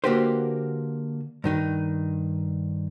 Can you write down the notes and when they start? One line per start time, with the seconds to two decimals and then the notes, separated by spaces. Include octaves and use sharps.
0.04 D3 A#3 F#4 G4 B4 C5
1.44 G2 D#3 D#4